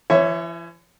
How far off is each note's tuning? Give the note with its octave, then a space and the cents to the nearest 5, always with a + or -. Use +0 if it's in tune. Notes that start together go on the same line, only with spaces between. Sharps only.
E3 +45 C#5 +0 E5 +0